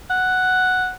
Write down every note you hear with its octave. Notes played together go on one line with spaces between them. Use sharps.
F#5